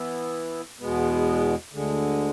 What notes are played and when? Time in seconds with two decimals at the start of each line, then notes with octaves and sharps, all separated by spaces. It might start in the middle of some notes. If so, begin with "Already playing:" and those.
Already playing: E3 B3 E4
0.79 E2 B2 G#3 B3
1.73 D2 D3 G#3